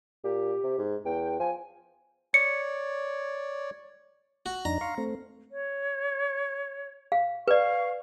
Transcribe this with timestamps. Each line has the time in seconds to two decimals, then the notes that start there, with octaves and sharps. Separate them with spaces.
0.24 A#2 G4
0.64 C3
0.79 G#2
1.05 E2 G5
1.40 F3 G#5
2.34 C#5 D5 C#7
4.46 F#4
4.65 F2 D4 D#4 A#5
4.81 F5 C6 C#6
4.98 A3 C4
5.50 C#5
7.12 F5
7.48 B4 D5 F5 C#6